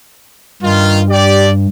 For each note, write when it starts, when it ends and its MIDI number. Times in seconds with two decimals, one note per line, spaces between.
0.63 1.67 43
0.63 1.01 51
0.63 1.01 65
1.10 1.49 67
1.10 1.49 74